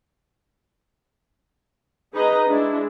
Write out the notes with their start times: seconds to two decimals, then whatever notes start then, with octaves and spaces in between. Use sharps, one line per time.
2.13 D#4 G#4 B4 D#5 A#5
2.48 G#3 D4 E4